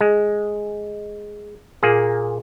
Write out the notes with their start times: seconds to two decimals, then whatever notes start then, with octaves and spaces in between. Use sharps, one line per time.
0.01 G#3
1.83 A#2 A#3 G#4